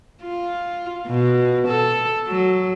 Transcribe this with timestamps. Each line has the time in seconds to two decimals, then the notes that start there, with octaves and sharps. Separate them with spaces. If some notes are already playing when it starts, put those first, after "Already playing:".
0.23 F4
1.07 B2
1.68 A4
2.28 F#3